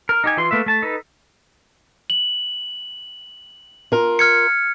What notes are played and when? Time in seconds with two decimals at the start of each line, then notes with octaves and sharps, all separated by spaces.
0.09 A#4
0.24 D#4 G4 G#5
0.37 E3 F4 C6
0.51 A3 A#3 B4 E5
0.66 A3 A5
0.82 D#4 A4 B4
2.10 F#7
3.92 F4 A#4
4.19 F6 G#6 C#7